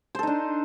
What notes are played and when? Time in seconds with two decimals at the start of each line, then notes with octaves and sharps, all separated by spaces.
0.15 C5
0.19 A4
0.23 D#4
0.27 D4